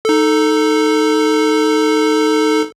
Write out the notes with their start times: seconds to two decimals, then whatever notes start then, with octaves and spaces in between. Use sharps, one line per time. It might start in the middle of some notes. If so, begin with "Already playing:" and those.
0.05 D#4 A4